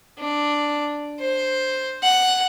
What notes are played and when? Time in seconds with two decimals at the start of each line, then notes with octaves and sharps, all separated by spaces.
0.19 D4
1.20 C5
2.03 F#5